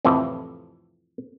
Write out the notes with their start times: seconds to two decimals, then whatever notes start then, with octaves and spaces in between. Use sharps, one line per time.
0.05 F2 A2 C3 E3 F3